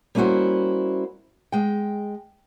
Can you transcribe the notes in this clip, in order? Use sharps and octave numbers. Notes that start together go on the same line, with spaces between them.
G3 A#3 C#4 E4 F#4 C5
G#3 G5